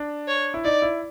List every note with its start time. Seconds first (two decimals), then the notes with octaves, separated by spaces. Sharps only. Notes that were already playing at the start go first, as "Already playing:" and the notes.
Already playing: D4
0.28 C#5
0.54 E4
0.64 D#4 D5
0.82 E4